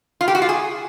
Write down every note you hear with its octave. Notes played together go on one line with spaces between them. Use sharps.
F4
G4
F#4
F4
G#4